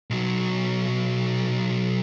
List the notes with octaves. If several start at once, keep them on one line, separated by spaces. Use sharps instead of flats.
B1 F#3